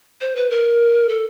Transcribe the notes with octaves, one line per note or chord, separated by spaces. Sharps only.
C5
B4
A#4
A4